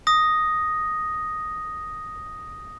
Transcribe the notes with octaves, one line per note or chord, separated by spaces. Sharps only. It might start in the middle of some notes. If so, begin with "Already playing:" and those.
D#6 A#6